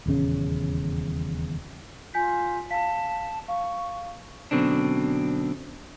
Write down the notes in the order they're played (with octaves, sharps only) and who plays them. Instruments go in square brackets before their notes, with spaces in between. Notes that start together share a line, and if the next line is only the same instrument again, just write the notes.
[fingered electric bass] D#1 E2 C#3 C#4
[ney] F4 [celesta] G#5 G6 B6
[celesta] F5 B6 [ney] A5
[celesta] F5 [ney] C#6
[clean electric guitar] F#2 B2 D3 C4 D4